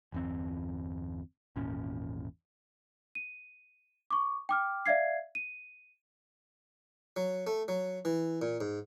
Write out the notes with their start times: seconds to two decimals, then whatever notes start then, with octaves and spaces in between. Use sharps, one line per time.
0.12 G1 E2 C4
1.56 G#1 E2 A#2 C#4
3.15 D#7
4.11 C#6 D6
4.49 G5 D6 F6
4.86 D5 E5 F5 G#6 C7
5.35 D#7
7.16 F#3
7.47 A3
7.68 F#3
8.05 E3
8.42 A#2
8.61 G#2